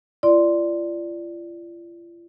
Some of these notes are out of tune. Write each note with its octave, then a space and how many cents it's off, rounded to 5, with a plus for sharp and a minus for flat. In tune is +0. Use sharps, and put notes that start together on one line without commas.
F4 -40 D5 +0 C6 +0